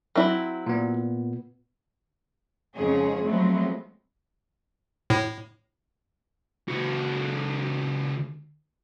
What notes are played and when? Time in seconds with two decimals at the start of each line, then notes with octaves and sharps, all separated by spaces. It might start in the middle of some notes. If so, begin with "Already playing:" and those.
0.16 F#3 C4 E4
0.67 A#2 B3
2.77 F2 G#2 C#3 F3 G#4 C#5
3.26 F3 F#3 G#3 A3 B3 C4
5.10 A2
6.68 C#2 F#4